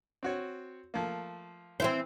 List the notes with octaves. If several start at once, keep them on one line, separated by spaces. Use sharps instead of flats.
C4 F#4 C#5
F3 A3 A#3
E3 C4 E4 C5